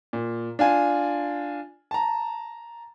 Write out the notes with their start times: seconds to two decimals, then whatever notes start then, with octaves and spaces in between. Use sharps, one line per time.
0.13 A#2
0.59 D4 F4 G#5
1.91 A5 A#5